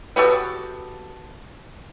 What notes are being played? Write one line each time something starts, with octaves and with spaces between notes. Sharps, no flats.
B3 F#4 G4 A4